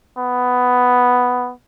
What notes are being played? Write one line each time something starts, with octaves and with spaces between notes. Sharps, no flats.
B3